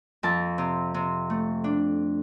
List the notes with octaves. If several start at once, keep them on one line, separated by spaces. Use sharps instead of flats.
F2 A5
C3
C3
A3
D4